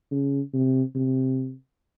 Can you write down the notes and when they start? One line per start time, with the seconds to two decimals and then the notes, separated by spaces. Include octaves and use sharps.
0.11 C#3
0.53 C3
0.95 C3